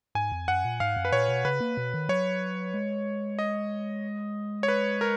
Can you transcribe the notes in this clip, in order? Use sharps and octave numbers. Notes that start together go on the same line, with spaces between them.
G#2 G#5
F2
F#2 F#5
A#2
G#2 F5
F#2
B4
A#2 C#5
B2
C#3 B4
A#3
B2
D#3
F#3 C#5
G#3
D#5
C#5
B4
A#4